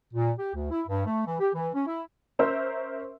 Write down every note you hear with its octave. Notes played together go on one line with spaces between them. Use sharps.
A#2
G4
D2
E4
G2
A3
E3
G4
E3
C#4
E4
C#4 A#4 C5 E5 C6 E6